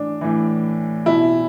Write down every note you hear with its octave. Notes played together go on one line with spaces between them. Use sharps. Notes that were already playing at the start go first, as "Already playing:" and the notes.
Already playing: A2 E3 D4
A2 E3
B2 E4